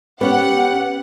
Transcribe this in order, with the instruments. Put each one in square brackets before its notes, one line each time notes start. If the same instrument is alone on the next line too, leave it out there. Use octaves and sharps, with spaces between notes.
[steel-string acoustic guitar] B3 C#4 [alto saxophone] G4 [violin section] F#5